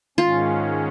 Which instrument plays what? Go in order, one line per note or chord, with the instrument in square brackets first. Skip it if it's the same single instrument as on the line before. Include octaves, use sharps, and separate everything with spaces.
[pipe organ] G#2 D#3 G#3 C#4 [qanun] F4